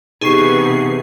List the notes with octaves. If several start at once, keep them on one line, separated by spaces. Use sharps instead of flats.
C3 E3 B3 D#4 G4 G#4 C#6 C7